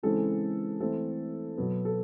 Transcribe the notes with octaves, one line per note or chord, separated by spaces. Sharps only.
C#3 E3 G#3 C4 A4
E3 A3 C4 A4
B2 F#3 B3
A4